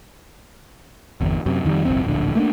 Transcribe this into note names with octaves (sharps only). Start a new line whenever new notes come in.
G1 E2
F#2 C3
F2 D#3 E3 G3
G1 C2 F2 C4
D1 A#1 D3
A3 A#3 C4 D4